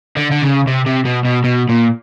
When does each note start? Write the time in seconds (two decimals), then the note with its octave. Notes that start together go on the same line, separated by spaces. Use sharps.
0.17 D3
0.31 D3
0.42 C#3
0.68 C3
0.86 C3
1.05 B2
1.25 B2
1.44 B2
1.69 A#2